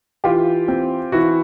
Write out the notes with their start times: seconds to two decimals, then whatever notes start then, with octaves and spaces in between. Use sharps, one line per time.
0.24 E3 F4 G4
0.68 C4
1.12 E3 E4 F#4